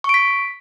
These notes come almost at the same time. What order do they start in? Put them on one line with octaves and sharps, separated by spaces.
C#6 D7 B6